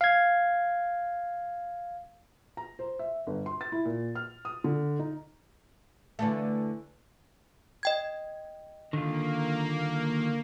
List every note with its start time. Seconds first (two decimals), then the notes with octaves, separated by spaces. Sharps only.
0.01 F5 G#6
2.57 A#5
2.79 C5
2.99 E5
3.27 G1
3.46 C6
3.61 A6
3.72 E4
3.85 A#2
4.15 F6
4.45 D#6
4.64 D3
4.99 D#4
6.19 D3 E3 A3
7.83 D#5 G5 G#6
8.93 D3 D#3 A#3 F4